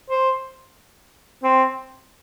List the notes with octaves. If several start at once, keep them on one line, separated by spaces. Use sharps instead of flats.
C5
C4